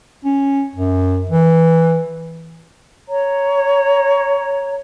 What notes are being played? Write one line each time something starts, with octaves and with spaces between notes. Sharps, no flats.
C#4
F#2
E3
C#5 A#5